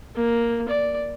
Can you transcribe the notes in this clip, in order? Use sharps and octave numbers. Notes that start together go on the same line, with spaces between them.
A#3
D5